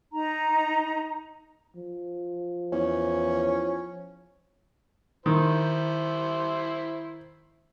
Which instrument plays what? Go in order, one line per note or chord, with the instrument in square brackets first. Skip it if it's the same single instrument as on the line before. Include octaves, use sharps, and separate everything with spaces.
[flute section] D#4 A#5
[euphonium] F3
[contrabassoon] E2 [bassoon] C#4
[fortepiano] D#3 [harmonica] E4 C5